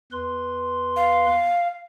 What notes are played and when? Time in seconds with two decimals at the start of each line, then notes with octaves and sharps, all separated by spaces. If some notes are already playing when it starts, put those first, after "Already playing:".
0.12 E2 B4 C6
0.96 F5